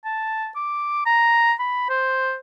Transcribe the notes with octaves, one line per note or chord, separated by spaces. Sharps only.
A5
D6
A#5
B5
C5